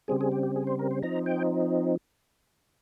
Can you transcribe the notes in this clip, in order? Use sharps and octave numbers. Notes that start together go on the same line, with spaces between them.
C#3 G3 C4 G#4
G#4
G4
G4
G#4
C5
A#4
C5
F3 C4 D#4 A#5
G5